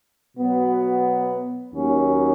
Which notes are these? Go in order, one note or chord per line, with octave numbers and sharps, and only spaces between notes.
B2 F#3 B3
D#2 D#3 F#3 A#3 C#4